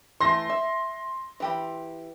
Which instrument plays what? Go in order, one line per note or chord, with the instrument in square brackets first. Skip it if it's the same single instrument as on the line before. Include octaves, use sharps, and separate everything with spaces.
[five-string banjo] E3 A3 [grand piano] C6 A#6
[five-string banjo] E5
E3 G4 B5